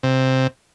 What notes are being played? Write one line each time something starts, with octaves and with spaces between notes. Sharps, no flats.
C3